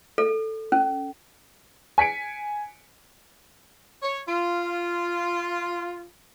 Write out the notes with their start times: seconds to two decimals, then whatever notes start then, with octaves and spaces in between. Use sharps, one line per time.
0.18 A4
0.72 C#4
1.98 G#5 B6 C#7 D7
4.02 C#5
4.27 F4